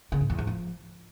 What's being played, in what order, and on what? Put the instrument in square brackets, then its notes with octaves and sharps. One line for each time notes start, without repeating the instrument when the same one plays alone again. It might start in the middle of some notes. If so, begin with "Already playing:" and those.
[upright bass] C#3
G#2
E2
G#2
F3